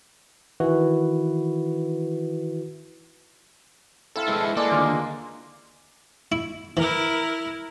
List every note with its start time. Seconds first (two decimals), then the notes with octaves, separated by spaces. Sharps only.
0.60 D#3 E3 E4 F#4 B4
4.16 C4 E4 A4 F5
4.28 G#3 E4 B4
4.57 G#3 A#3 E4 A4 D5
4.71 D#2 D3 F4
6.32 E4
6.77 E3 E4 A#4